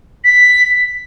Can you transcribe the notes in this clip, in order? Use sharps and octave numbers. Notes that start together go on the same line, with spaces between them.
B6